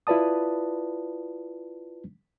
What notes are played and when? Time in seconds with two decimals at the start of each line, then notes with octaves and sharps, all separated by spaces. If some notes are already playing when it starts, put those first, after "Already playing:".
0.07 E4 F4 B4 D5 A5 D#6